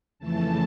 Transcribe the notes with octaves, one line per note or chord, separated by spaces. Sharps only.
F2 C#3 E3 A3 A5